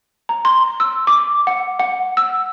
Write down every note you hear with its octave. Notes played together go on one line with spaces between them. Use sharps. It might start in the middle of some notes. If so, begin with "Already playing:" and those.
A#5
C6
E6
D6
F#5
F#5
E6